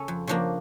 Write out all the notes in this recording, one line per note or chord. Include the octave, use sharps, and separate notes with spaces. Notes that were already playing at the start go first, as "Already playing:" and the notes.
Already playing: C#3 C#4 A4
F2
C#3 F3 A#3 D4